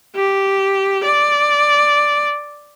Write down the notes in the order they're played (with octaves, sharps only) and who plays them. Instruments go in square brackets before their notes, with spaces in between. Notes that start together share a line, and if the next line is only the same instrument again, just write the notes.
[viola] G4
D5